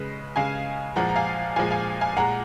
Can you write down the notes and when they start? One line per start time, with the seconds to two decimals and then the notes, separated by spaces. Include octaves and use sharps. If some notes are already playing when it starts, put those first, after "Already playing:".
Already playing: C#3 G#3 B4 D#5
0.36 C#3 G#3 F5 G#5
0.96 A#2 F3 G#3 F#5 A#5
1.09 A#5
1.16 F5 G#5
1.56 A#2 F3 G#3 F5 G#5
1.71 F5 G#5
2.01 F5 G#5
2.17 A#2 G#3 F#5 A#5